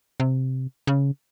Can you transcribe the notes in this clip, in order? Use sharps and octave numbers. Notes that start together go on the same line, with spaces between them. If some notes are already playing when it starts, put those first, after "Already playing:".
C3
C#3